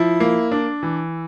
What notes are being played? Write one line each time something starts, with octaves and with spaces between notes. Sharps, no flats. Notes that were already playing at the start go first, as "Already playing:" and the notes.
Already playing: F3 E4
A#3
D4
E3